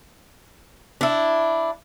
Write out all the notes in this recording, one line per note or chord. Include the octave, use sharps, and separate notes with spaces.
D4 E4